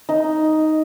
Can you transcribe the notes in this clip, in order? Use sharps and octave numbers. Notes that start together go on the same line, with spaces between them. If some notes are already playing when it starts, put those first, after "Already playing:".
D#4